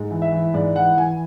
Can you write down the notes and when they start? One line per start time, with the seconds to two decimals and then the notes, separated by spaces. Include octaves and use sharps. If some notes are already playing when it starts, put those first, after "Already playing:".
Already playing: G#2
0.11 E3
0.22 E5
0.33 E3
0.54 G#2 D5
0.76 E3 F#5
0.98 E3 G#5